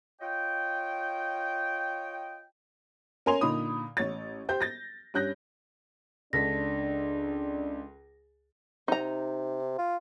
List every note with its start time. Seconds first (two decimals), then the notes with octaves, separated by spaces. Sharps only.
0.21 F4 C#5 D#5 G5
3.26 C#4 A#4 G#5 C6 F7
3.41 A#2 D3 A#3 D#4 B5 D#6
3.97 A1 C#5 A6
4.49 G4 C5 G6
4.61 A6 A#6
5.14 G2 C#4 F#6 G6 A#6
6.33 C#2 D4 A4 D5 A#6 B6
8.88 C3 D#4 A#5
9.78 F4